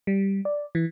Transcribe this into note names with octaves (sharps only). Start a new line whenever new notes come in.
G3
D5
E3